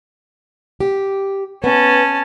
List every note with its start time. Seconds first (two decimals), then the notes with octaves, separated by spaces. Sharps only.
0.80 G4
1.64 B3 C#4 A5